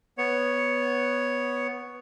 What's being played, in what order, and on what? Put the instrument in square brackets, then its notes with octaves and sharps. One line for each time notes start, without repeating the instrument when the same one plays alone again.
[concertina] B3 C#5